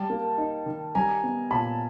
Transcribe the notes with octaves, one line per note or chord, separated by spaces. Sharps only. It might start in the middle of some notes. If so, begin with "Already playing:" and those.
Already playing: G3 G5 A5
A#3
D#4
D#3
G3 G#5 A#5
B3
A#2 A5 B5